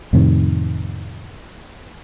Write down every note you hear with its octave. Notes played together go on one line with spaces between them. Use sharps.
F2 A2 C3 D#3